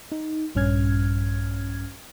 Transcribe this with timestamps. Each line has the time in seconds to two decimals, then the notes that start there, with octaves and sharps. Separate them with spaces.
0.12 D#4
0.55 A#1 G2 C#4 F6 G#6